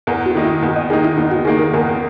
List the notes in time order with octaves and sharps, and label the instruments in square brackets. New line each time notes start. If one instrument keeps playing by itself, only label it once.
[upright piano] E2 [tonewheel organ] A#4
[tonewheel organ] F#4
[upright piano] D#3 A#3 D#4
[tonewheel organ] E4
[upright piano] E2
[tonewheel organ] D#5
[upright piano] D#3 A#3 D#4 [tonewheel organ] G#4
[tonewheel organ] E4
[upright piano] E2 [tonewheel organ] D#4
[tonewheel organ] F#4
[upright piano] D#3 A#3 D#4 [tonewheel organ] G#4
[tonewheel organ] A#4
[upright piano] E2 [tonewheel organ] A#4